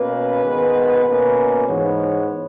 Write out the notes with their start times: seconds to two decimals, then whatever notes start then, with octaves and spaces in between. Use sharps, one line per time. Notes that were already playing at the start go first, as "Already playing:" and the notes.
Already playing: B2 A#3 C#4 B4
0.43 G#2 D#3 G#3 B3
1.05 B2 A#3 C#4
1.67 G#2 E3 G#3 B3 C#5